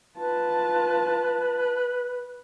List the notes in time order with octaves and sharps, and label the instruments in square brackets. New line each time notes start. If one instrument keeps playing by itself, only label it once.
[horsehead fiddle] F4 A5 [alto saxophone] B4